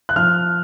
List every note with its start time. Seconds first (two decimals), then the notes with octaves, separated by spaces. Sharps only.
0.09 F#6
0.16 F3 F6